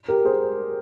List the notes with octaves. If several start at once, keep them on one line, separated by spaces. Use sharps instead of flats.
G4 A#4
G#4 C5